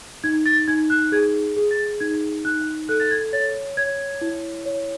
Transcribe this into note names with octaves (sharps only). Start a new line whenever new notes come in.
D#4 G#6
A6
D#4 G#6
F#6
G#4 G#6
G#4
A6
D#4 G#6
D#4 F#6
A4 F#6
A6
G#6
C#5 A6
C#5 G#6
E4
C#5